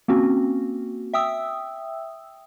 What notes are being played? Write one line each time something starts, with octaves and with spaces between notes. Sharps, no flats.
A#3 C4 C#4 F#4
E5 G5 D#6 E6